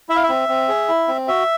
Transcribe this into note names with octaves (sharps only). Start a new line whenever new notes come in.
E4 E5
F5
E5
C4
C4
G#4
E4
C4
F#4 E5